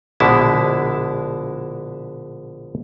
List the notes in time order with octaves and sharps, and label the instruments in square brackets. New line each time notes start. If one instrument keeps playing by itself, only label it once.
[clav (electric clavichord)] A#1 B2 D3 G#3 E4 A5